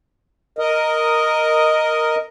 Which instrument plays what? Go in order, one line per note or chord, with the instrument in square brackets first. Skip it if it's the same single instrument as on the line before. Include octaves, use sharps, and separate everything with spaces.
[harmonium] A#4 D#5